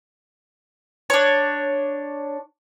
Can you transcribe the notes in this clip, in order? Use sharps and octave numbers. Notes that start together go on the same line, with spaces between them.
D4 C#5